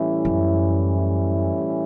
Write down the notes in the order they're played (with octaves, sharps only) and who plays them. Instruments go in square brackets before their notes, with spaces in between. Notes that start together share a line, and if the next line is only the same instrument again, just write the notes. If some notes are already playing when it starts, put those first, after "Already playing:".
Already playing: [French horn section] A2 E3 G3 C#4 E4
[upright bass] F#2